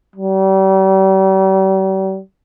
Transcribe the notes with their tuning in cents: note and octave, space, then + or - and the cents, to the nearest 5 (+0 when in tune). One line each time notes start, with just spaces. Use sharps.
G3 -40